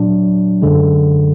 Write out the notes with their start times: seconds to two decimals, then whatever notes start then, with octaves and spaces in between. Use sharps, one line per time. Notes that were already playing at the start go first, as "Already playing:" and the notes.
Already playing: A#2 F#3 D4
0.62 F#2 D3 G#3